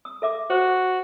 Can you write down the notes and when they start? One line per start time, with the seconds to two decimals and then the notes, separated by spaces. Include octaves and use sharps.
0.05 D#6
0.22 A4 E5 D6
0.50 F#4 C5